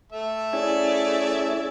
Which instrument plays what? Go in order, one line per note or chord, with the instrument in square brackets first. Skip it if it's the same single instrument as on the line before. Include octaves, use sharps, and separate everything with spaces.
[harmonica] A3 E5
[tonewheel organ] C#4 E4 G#4 [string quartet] D5